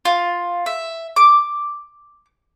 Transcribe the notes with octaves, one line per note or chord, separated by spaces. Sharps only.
F4
E5
D6